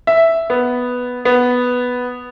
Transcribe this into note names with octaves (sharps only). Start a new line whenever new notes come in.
E5
B3
B3